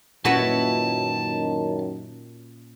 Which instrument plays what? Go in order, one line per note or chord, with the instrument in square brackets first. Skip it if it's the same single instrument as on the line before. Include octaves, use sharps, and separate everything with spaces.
[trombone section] F#2 D#3 [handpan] A#2 C#4 [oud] E4 F#4 B4 [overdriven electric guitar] A5